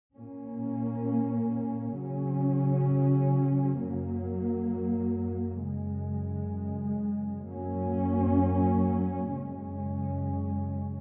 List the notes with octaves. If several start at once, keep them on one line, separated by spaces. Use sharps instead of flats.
A#2 A#3 C#4
C#3 F#3 C#4
F#2 F#3 A#3
F#2 C#3 G#3
F#2 F#3 A#3 C#4
F#2 C#3 G#3 C#4